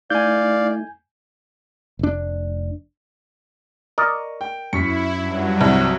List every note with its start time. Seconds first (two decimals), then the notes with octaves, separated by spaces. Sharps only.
0.10 A3 D#4 E4 D5 F5 G#5 G6
1.99 F1 D4
3.98 A#4 D5 D#5 C#6
4.41 G5
4.73 F#2 E4 C#6 B6 C#7
5.18 G2 F#3
5.61 C2